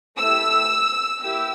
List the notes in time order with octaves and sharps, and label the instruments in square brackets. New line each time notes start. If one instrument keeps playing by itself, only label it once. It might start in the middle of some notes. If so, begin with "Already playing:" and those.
[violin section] A3 E4 G4 E6
A#3 E4 G4 E6